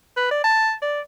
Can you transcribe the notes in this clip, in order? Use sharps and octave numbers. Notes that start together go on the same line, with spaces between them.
B4
D5
A5
D5